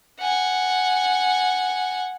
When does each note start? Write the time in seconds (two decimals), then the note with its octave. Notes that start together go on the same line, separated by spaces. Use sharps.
0.20 F#5 G#5